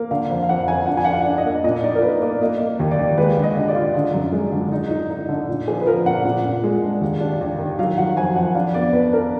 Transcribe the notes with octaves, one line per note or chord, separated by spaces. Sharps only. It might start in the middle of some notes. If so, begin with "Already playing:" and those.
Already playing: A#3
D3 F5
F2
F5
F2 F#5
F2 G#5
D4 F#5
G#5
D4 F#5
F5
D4
D#5
A#3
A#2 D#5
D#4 D5
A#4
A#3 B4
A#3 D5
A#3 D#5
A#3
D#2
D5
D#2
G#3 B4
D3
D#5
D3
D5
F4
D3
F#2
G#3
D3
D#4
D#4
D#4
D3
A#2
F3 G#4
B4
F3 A#4
A#2 F#5
A#2
A#2
G#3
D4
D#2
D4
D#2
D#3
F#3 F5
F#3 F#5
F2 G#5
F2 F#5
D4 F5
B3 D5
B3 B4
D4 A#4